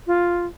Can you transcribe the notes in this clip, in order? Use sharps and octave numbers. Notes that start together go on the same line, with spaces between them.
F4